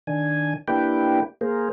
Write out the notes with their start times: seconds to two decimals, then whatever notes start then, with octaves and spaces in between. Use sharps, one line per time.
0.07 D#3 D4 G#5
0.68 A#3 D4 E4 G4 B4 G5
1.41 A#3 G#4 A#4 C5